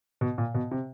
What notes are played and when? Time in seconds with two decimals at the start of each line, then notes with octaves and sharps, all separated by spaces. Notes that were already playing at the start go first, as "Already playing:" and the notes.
0.21 B2
0.38 A#2
0.54 B2
0.71 C3